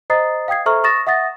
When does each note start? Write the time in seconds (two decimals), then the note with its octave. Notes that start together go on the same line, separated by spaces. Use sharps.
0.10 C5 D#5 A#5 D#6 A6 C7
0.48 F5 G5 D#6 G#6 C7
0.66 A4 C5 E5 A#5 C#6 F6
0.84 C#6 D#6 A6 A#6 E7
1.07 E5 F#5 D#6 A6 A#6